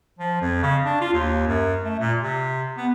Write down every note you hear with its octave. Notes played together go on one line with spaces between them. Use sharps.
F3
F2
C#3
D4
F4
D#2
F#2
A3
A#2
C3
B3